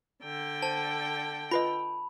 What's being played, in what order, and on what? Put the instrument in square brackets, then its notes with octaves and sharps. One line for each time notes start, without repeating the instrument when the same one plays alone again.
[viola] D3 G5
[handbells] C5 [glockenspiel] A5
[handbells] F4 B4 D#5 [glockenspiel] B5